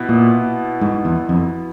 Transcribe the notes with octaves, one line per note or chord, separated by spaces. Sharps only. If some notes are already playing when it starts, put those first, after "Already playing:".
Already playing: B2 B3 E4
A#2
G#2
E2
F2